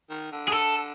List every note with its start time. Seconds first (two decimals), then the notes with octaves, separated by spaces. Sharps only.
0.10 D#3
0.32 D3
0.48 G#4
0.52 A4